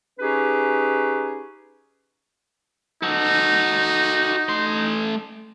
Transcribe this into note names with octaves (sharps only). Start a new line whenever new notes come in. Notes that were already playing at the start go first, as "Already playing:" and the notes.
C#4 D#4 G4 G#4 B4
D#4 F#4 A4
A3 C6